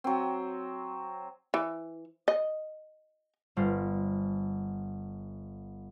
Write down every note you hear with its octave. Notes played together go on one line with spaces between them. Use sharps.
F#3 C4
E3
D#5
G1 C5 F5